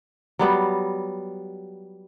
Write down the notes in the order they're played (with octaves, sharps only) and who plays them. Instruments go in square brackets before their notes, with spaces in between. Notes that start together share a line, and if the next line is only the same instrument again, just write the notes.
[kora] F#3 G3 B3